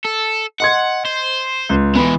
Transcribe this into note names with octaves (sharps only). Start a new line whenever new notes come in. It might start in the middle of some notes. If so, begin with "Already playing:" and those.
A4
D#5 F#5 C6 G#6
C5
C#2
E3 G#3 B3 B5